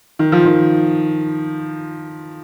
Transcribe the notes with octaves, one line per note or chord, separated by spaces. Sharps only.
D#3
F3
D#3